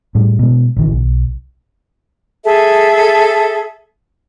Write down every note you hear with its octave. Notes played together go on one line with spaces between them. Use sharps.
A2 G3
B2 G#3
A1 D#3 E3
B1
G#4 A4 E5